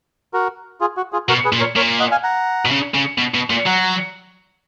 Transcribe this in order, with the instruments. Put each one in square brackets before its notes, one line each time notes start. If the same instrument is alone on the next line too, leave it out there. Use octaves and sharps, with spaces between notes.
[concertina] F#4 A#4
F4 G#4
F#4
F4 G#4
[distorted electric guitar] B2 [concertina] F#4 A#4
[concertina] G#4 B4
[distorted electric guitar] A#2
[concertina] A#4 C#5
[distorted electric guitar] A#2 [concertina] A#4 C#5
[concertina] D#5 F#5
F5 G#5
F#5 A#5
[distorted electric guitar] B2
C#3
C#3
B2
B2
A#2
[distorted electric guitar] F#3 [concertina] F#5 A#5